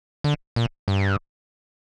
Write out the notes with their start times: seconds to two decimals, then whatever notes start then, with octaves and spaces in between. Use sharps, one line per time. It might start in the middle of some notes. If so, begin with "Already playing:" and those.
0.24 D3
0.56 A#2
0.88 G2